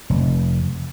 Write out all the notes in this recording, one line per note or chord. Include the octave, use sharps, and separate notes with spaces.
F1